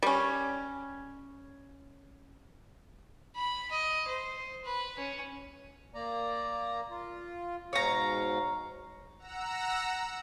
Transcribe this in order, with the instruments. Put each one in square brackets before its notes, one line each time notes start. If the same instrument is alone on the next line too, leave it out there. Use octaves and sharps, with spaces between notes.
[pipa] G3 C#4
[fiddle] B5
D#5
C5
B4
C#4
[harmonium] A#3 D5 A#5
F4
[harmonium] G#2 B2 F5 [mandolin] C#5 A#5
[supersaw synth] F#5 A#5 E6